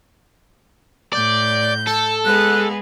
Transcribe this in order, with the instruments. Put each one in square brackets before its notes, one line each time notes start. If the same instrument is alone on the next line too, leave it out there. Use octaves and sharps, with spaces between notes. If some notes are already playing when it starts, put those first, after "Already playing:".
[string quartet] A2 G6 [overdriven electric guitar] D5
[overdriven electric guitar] A4 [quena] A5
[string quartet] G#3 B3 G#4 [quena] F#6